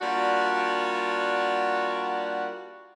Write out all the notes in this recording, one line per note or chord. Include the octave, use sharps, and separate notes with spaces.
G3 A#3 D4 F4 F#4 F#5